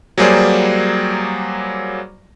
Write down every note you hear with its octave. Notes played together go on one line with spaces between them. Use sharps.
F#3 G3 A#3 G#4 C5 D5